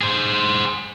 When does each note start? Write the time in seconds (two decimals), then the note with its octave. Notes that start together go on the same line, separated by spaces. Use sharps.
0.01 G#4 C5